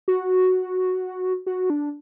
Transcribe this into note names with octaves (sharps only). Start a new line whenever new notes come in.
F#4
F#4
D4